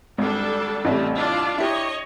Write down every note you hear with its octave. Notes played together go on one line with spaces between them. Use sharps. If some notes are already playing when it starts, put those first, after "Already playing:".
G#1 G3 D4 A4
A1 C3 G3 A3
D4 F4 D5
E4 G4 C#5 D#5